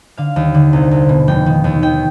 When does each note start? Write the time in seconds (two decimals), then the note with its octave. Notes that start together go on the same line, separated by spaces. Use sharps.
0.18 D3 F5
0.36 D#2
0.55 D3
0.73 C2
0.91 C2
1.09 B2
1.28 F1 G5
1.46 D#3
1.64 D#2
1.82 D#3 G5